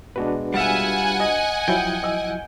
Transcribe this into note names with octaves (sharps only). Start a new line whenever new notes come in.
B2 G#3 D4 F#4 B4
G3 F4 E5 F#5 G#5
D#5
F3 F#3 E4 G5
D#5 E6